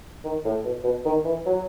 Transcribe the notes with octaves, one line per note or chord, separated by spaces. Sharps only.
D#3
A2
B2
B2
D#3
E3
F#3